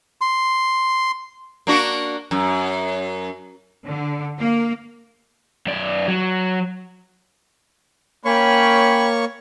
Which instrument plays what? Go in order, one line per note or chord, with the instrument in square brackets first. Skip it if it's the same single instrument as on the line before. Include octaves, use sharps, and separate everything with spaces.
[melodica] C6
[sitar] A#3 D4 F#4
F#2
[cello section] D3
A#3
[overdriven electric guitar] F#2 D5
F#3
[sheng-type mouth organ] A#3 C#5 C#6 [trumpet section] C#4 G5 B5